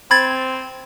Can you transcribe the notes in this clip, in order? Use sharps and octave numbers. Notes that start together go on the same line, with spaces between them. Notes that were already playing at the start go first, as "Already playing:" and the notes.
C4 B5 G#6 A6